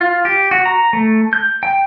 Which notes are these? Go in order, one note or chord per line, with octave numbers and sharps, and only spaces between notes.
F4
G4
F#4
A#5
A3
G6
G5